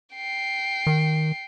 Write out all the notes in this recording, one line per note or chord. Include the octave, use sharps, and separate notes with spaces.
G5 C7
D#3